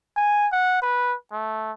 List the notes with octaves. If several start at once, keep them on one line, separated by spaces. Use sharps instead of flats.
G#5
F#5
B4
A3